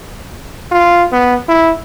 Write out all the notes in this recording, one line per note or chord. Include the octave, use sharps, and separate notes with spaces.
F4
B3
E4